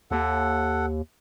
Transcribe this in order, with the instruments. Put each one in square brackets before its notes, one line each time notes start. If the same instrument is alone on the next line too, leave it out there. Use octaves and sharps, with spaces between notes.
[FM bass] D#2 [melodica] A4 F#5